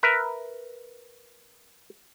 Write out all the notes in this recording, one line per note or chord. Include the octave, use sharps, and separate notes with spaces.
A#4 B4 E5